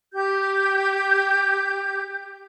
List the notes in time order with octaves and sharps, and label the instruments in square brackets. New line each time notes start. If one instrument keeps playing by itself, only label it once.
[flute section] G4 G6